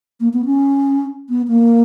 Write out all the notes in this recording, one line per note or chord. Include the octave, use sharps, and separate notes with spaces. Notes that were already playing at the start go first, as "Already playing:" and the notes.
A#3
B3
C#4
B3
A#3